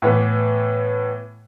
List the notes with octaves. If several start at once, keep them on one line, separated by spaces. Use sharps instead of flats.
A2 E3 B3